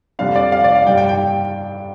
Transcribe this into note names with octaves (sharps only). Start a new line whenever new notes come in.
F2 D3 G3 D4 F5
D5
F5
D5
F5
G2 G3 D4 G5
G5
G5